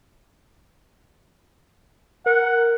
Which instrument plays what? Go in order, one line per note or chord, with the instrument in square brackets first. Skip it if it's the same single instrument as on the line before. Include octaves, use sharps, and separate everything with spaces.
[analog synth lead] A#4 [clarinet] F#5